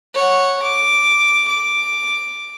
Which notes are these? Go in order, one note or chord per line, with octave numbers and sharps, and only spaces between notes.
C#5 F#5
D6
D6